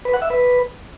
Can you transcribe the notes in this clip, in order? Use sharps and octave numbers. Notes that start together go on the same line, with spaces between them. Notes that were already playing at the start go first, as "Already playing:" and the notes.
B4
F#5
E5
B4